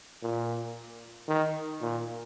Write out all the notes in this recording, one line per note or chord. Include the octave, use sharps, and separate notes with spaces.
A#2
D#3
A#2